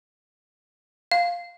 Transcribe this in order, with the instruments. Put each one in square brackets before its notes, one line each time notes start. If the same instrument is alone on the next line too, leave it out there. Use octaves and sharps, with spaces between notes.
[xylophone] F5